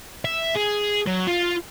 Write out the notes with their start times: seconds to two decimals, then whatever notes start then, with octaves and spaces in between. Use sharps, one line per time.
0.25 E5
0.56 G#4
1.07 F#3
1.27 F4